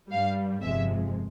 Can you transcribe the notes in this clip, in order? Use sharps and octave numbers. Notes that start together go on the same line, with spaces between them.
G2 G3 F5
G1 F2 C3 F3 G#3 E5